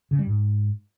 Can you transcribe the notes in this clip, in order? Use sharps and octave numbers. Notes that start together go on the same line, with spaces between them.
C#3
G3
G#2